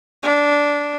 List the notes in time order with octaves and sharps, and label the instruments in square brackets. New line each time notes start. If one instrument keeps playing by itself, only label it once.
[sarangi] D4